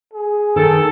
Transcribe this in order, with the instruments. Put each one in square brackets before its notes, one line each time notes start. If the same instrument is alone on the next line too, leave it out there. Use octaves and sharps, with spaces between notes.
[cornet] G#4
[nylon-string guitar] D#3 [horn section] A4